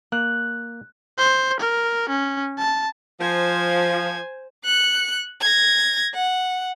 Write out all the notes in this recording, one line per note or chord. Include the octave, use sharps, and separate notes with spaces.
A#3 F#6
C5
A#4
C#4
A5
F3 C5 G#5
F#6 C#7
G#6 A#6
F#5